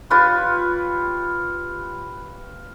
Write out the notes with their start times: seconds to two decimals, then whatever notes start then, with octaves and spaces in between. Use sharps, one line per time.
0.10 F4 G4 B4 C#5